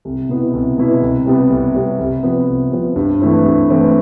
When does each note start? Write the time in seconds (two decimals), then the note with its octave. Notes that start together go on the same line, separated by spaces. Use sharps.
0.05 C2
0.29 B2 B3 E4
0.53 C2
0.78 B2 B3 E4
1.02 C2
1.26 C3 G3 B3
1.50 C2
1.75 C3 G3 B3
1.99 C2
2.23 C3 F3 B3
2.48 C2
2.71 C3 F3 B3
2.96 G2
3.20 E3 A3 C4 E4
3.45 G2
3.69 E3 A3 C4 E4